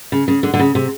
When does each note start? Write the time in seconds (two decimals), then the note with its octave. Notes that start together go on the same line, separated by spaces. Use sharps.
0.12 C#3
0.28 C#3
0.43 D3
0.54 D3
0.59 C#3
0.75 C3